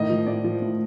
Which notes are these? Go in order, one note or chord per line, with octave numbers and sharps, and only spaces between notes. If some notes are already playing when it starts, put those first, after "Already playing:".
Already playing: A2 D#3 D#5
F3
A2 D5
F3
A2